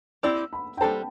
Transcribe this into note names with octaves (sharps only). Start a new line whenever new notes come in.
C4 E4 G4 D5 E6
B5
G5
G3 D4 A4 C5 A5